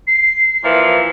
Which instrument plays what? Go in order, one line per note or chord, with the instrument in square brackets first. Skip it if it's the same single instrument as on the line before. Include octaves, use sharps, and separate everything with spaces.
[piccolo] C7
[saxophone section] A#2 E3 F3